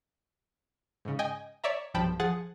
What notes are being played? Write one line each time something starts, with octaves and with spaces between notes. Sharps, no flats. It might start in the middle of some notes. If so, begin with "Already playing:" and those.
G#2 C#3
D#5 G5 G#5
C#5 D5 E5 A#5
B1 G2 F3 G5 A5 B5
F3 G#4 F#5 A6